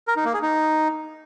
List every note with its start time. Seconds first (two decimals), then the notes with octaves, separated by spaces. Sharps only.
0.08 A#4
0.16 D#4
0.25 A#3
0.34 G#4
0.42 D#4